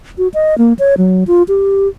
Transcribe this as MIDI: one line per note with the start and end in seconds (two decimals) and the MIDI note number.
0.18 0.28 66
0.34 0.57 75
0.58 0.73 58
0.79 0.95 73
0.98 1.24 54
1.27 1.43 65
1.48 1.88 67